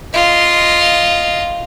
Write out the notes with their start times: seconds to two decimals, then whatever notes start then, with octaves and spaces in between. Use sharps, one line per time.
0.14 F4 D#5